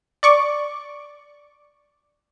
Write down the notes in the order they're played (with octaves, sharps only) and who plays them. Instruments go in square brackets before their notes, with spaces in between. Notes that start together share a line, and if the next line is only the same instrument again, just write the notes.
[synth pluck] D5 C#6 D6